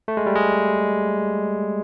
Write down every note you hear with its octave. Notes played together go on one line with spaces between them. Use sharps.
A3
G#3
G3
G#3